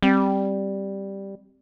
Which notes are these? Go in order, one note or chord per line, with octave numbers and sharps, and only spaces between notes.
G3 C4